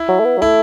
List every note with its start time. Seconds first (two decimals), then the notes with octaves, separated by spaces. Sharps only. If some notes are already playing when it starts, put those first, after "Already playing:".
Already playing: E4
0.09 F#3
0.20 A3
0.25 B3
0.38 F#3
0.42 A3 E4